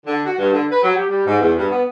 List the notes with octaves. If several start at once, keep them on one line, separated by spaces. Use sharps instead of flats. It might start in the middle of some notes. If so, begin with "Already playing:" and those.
D3
F#4
G2
D3
B4
F#3
G4
G3
G#2
E2
G2
B3